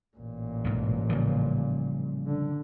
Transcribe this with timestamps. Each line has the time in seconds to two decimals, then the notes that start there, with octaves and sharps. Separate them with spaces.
0.17 A1 A#2
0.64 B1 G#2
1.10 C#3 F3 G3
2.26 D3